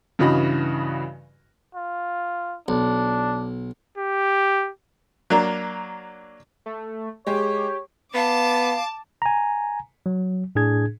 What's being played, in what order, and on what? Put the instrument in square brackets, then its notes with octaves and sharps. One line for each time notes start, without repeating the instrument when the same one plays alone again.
[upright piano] G2 C#3 E3 F#4 D#5 B5
[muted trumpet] F4
[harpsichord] B1 [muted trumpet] D4
[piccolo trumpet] G4
[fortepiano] F#3 A#3 D4
[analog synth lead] A3
[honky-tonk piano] G#3 [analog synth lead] G4 [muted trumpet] C#5
[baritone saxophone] B3 [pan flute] F5 [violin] A5 D6
[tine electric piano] G#5 A#5
F#3
A2 D4 G#4 G#6